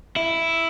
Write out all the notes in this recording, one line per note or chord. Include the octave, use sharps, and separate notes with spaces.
E4